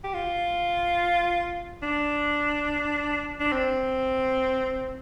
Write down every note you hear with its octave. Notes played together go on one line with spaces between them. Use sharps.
G4
F4
D4
D4
C4